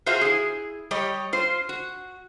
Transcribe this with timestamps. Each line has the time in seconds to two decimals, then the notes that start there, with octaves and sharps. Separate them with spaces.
0.06 F4 F#4 G#4 C5 E5 F5
0.21 E4 G#4
0.91 G3 G4 C#5 D#5
1.33 F4 C5
1.69 F#4